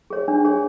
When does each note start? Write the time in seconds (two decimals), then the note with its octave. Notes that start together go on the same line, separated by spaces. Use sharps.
0.10 G#4 C#5
0.28 D4
0.45 G#4 C#5